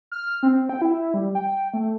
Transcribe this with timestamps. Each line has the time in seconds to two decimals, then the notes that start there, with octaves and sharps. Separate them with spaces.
0.12 F6
0.43 C4
0.69 G5
0.82 E4
1.14 G3
1.35 G5
1.74 A3